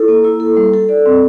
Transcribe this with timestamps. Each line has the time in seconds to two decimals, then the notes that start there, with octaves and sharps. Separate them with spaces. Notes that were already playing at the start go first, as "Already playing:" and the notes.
Already playing: E4 F4 A4
0.08 A#3
0.25 E4
0.40 A4
0.57 G3
0.74 A4
0.89 D5
1.06 C4